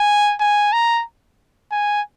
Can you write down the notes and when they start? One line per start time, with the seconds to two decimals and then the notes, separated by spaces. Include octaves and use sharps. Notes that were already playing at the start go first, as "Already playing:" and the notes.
Already playing: G#5
0.40 G#5
0.73 A#5
1.72 G#5